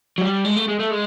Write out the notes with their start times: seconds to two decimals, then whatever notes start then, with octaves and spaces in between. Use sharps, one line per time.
0.18 F#3
0.21 G3
0.45 G#3
0.56 A3
0.68 G#3
0.79 A3
0.91 G#3